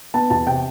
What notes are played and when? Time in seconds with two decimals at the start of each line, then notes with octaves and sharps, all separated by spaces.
0.14 B3 A5
0.30 E2 A5
0.47 C3 G5